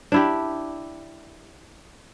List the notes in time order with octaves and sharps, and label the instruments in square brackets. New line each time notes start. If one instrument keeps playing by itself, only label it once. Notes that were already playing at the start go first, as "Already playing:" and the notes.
[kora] D4 E4 G4